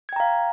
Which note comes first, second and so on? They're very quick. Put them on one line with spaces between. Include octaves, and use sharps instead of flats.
G#6 G5 A#5 F5